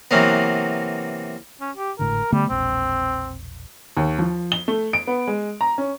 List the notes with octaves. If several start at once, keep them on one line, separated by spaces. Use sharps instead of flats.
C3 E3 F#3 A#3 B3
C#4
G4
G#1 A2 D3 A#4
D3 G3 A3 B3
E1 A#1 C4
D#2
F3
G7
A3
D7
B3
G#3
A#5
C#4